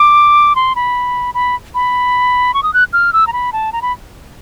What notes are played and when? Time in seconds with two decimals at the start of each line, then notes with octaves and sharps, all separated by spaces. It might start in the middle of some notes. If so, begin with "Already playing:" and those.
Already playing: D6
0.56 C6
0.76 B5
1.34 B5
1.75 B5
2.54 C#6
2.63 D#6
2.74 F#6
2.93 F6
3.13 E6
3.27 A#5
3.33 B5
3.53 A5
3.73 A#5
3.82 B5